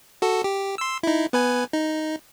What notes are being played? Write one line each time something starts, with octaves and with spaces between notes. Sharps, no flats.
F#4 A4
G4
C6 E6
D#4 E4
B3 B4 G#5
D#4